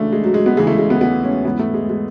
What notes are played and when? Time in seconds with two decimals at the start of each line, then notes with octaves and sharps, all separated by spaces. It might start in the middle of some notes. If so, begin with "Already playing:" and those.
Already playing: D2 C#3 E3 A3 D4
0.12 G#3
0.24 F#3
0.34 G#3
0.46 B3
0.57 D2 C#3 E3 G#3
0.67 A3
0.78 G#3
0.90 B3
1.01 B3
1.23 C#4
1.45 G#2 E3 B3
1.59 A3
1.74 G#3
1.89 G#3